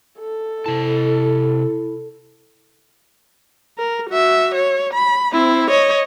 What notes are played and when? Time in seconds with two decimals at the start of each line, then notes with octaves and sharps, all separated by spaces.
0.19 A4
0.66 C3 E4 A5
3.78 A#4
4.10 F#4 E5
4.55 C#5
4.93 B5
5.33 C4 E4
5.71 C#5 D#5